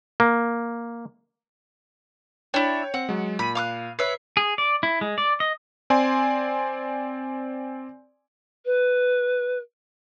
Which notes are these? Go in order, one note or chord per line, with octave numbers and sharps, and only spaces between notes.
A#3
D4 E4 C#5 G5
C4 F#5
F#3 G#3
A#2 B5 D#7
F5 D6 F#6
B4 C#5 E5 C7
G#4
D5
E4
G#3
D5
D#5
C4 D5 G#5 C6
B4